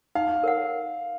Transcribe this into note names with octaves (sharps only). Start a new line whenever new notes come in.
D#4 F5
A#4 C#5 F#5